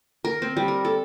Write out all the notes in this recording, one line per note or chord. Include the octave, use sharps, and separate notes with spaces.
A#4
C4
G3
A#4
A4